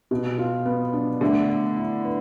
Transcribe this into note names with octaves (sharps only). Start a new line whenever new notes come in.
B2
F4
B3
D4
D3 A3
A3
E4
B4